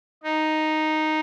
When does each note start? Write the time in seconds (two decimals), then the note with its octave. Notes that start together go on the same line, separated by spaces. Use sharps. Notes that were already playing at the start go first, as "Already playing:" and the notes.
0.24 D#4